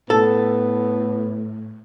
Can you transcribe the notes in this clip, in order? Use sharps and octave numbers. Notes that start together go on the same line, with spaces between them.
A2 B3 A4